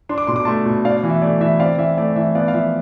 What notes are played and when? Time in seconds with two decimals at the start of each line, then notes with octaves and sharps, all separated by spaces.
0.09 D4 C6
0.18 D6
0.27 B2 C6
0.36 D6
0.45 A3 A5 C6
0.65 B2
0.84 D4 D5 F5
0.97 D5
1.03 E3
1.10 E5
1.22 A3 D5
1.40 E3 E5
1.59 C4 D5 F5
1.78 E3 E5
1.97 A3 D5
2.16 E3 E5
2.35 B3 D5 F5
2.48 F5
2.53 F3 E5